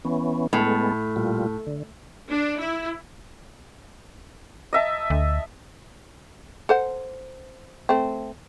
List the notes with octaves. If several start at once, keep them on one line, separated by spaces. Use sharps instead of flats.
E3 B3 C#4
A2 G#3 B3 A4
A#2 G3 F4
D3
D4
E4
D#5 E5 A5
D2
A4 C5 F#5
A3 C4